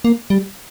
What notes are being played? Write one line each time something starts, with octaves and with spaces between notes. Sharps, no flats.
A#3
G3